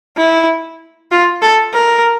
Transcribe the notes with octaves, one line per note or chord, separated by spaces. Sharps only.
E4
F4
A4
A#4